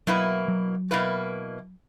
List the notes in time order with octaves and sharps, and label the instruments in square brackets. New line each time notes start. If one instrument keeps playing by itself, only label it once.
[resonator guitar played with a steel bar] B2 A#3 E4 B4 [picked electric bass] F#3
[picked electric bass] F#3
[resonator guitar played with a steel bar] B2 A#3 E4 B4